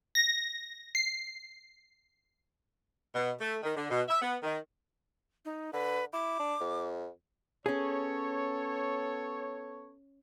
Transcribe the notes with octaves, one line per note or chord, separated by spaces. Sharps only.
A#6
C7
B2
A3
D#3
D3
B2
E5
B3
D#3
D#4
D3 B4
E4 D6
D4
F2
B3 C#4 G#4 A4 C#5